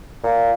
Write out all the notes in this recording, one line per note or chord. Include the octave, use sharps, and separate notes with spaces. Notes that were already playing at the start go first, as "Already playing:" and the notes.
A#2